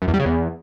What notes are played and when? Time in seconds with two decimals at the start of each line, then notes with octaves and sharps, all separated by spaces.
0.02 F#2
0.08 E2
0.14 G3
0.20 C#3
0.26 E2